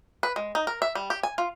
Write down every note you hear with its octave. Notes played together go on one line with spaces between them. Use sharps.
B4
G#3
D#4
A#4
E5
G3
G4
G#5
F4